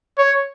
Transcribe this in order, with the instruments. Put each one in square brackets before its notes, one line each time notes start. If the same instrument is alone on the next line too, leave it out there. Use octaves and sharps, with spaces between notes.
[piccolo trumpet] C#5